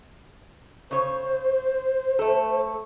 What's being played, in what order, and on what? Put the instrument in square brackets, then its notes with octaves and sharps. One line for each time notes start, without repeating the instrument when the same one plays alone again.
[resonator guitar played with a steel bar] C#3 C#5 [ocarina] C5
[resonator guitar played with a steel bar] A3 A4